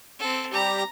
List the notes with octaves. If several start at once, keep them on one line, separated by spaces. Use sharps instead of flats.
C4 A4
G3 G4 A#5